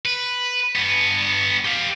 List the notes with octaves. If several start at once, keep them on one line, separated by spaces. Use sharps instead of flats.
B4
G2 B3
G4 F5